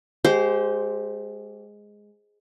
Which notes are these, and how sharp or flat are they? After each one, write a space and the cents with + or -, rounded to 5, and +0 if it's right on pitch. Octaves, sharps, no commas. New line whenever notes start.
G#3 +0 G4 -30 C5 +0